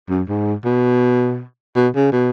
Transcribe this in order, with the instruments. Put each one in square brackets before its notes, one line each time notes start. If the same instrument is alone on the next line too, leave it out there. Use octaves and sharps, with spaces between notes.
[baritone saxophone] F#2
G#2
B2
B2
C#3
B2